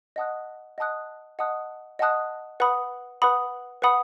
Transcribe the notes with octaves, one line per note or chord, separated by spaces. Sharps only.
D#5 F#5 A5 D#6 F#6
D#5 F#5 A5 D#6 F#6
D#5 F#5 A5 D#6 F#6
D#5 F#5 A5 D#6 F#6
B4 F#5 B5 D#6
B4 F#5 B5 D#6
B4 F#5 B5 D#6